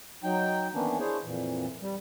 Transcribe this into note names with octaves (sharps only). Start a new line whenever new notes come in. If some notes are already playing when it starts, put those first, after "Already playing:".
F#3 D#4 G5
D#3 E3 A#3 B3 C#4 D4
D4 E4 G#4 C5 C#5
F2 A#2 E3
G3